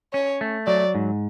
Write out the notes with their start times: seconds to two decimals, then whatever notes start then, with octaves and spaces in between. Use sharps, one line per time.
0.13 C#4 C#5
0.41 A3
0.67 F#3 D5
0.95 G#2